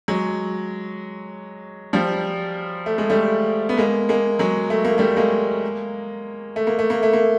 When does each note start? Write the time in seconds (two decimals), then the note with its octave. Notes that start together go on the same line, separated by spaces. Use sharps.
0.08 F#3 G#3
1.93 F3 G3
2.86 A3
2.98 G#3
3.10 G3 A3
3.69 B3
3.78 G#3 A#3
4.09 G#3 A#3
4.39 F#3 G#3
4.70 A3
4.85 A#3
4.98 G3 A3
5.17 G#3 A#3
6.56 A3
6.67 A#3
6.79 A3
6.90 A#3
7.03 A3
7.13 A#3